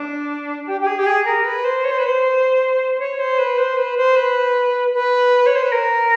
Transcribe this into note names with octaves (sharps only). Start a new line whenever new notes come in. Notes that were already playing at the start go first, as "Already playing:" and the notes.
Already playing: D4
G4
G4
G#4
G4
G#4
A#4
B4
C5
C#5
C5
B4
C5
C5
C#5
C5
B4
C5
B4
C5
B4
B4
C#5
C5
B4
A#4